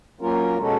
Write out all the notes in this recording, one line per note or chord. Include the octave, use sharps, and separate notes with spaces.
F#3 A#3 C#4 F4 A#4
B2 G#3 C#4 F#4 A4